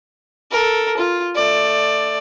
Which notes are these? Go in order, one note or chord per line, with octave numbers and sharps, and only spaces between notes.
A4 A#4
F4
A3 D5